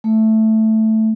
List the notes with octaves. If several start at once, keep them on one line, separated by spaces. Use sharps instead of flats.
A3